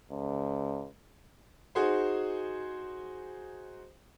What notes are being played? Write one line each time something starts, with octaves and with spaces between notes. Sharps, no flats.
C#2
D#4 F#4 G#4 C5